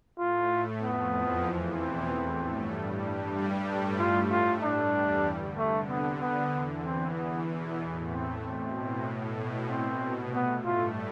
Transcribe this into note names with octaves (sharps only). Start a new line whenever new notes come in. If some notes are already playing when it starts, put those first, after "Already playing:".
A2 A3 F4
A2 A3
F2 F3 B3
E2 E3
E2 E3
B2 B3 C4
A2 A3
G2 G3
D4
G2 G3
A2 A3 D4
A2 A3 F4
A2 A3 F4
G2 G3 D4
E2 E3
D3
C3 A3
D3 B3
B3
E2 E3
E2 E3 C4
E2 E3 B3
B2 B3
A2 A3
A2 A3 C4
B2 C4
A2
B2
B2 C4
C3
A2 A3 B3
G2 G3 F4